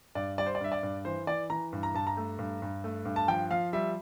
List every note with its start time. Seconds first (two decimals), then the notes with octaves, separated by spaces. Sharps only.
0.15 G2 D5
0.38 G3 D5
0.46 C5
0.55 D5
0.61 G2 E5
0.72 D5
0.83 G2
1.05 E3 C5
1.27 E3 D5
1.50 E3 A#5
1.73 G2
1.83 A#5
1.94 G2 A5
2.07 A#5
2.17 A3
2.39 G2
2.62 G2
2.84 A3
3.05 G2
3.16 A5
3.28 F3 G5
3.51 F3 F5
3.73 G3 E5